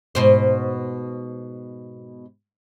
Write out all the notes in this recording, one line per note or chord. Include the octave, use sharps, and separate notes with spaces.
G#2 B2 C5